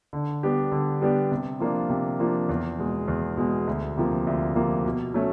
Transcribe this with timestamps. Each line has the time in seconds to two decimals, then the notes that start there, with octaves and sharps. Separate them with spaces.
0.13 D3
0.43 G3 B3 D4 G4
0.72 D3
1.02 G3 B3 D4 G4
1.32 C3
1.60 F3 A#3 D4 F4
1.90 C3
2.20 F3 A#3 D4 F4
2.49 E2
2.79 B2 G#3
3.08 E2
3.37 B2 G#3
3.67 D2
3.97 C3 F3 A#3
4.27 D2
4.56 C3 F3 A#3
4.86 B2
5.14 F#3 A3 C#4